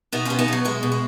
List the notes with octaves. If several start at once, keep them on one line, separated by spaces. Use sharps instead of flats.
B2 B3 D#4
B2 C#4 F4
B3 D#4
B2 F#3
B2 G#3
B2
G#3